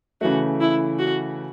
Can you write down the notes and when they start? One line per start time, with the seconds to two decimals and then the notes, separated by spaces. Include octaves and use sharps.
0.21 C#3 E3 A3 F#4
0.60 E4
0.99 F#4